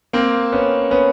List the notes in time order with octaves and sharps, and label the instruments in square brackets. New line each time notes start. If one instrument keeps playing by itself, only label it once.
[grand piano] A#3 C4
B3 C#4
B3 C#4